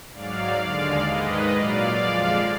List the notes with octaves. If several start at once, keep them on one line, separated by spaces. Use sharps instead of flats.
G#2 F#3 D5 F5
D#2 D3 G#3 D5 F5
G#2 D#3 G#3 B4 D#5
A#2 F#3 D5 F5
F2 F3 G#3